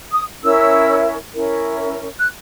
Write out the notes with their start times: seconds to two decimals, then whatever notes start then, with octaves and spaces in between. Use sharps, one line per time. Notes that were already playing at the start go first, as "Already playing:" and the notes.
0.12 D#6
0.43 C#4 E4 A#4 E6
1.35 C#4 E4 A#4
2.19 F#6